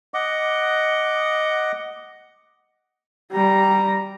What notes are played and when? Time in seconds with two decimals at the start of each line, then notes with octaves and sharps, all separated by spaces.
0.14 D#5 F#5 D6
3.32 G3 A#5